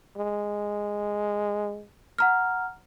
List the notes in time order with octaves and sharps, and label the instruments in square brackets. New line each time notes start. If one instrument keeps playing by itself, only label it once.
[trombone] G#3
[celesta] F#5 A#5 F6